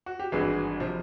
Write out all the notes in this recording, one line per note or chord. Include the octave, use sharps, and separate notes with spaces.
F#4
G4
G#1 G2 E3 F#4 G#4
C3 F3